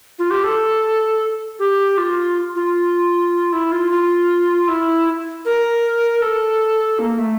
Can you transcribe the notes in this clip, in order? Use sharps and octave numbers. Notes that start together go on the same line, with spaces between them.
F4
G4
A4
G4
F4
F4
E4
F4
F4
E4
A#4
A4
A#3
A3